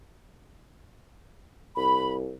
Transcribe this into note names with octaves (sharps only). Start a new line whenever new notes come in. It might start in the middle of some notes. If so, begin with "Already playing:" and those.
C2 B5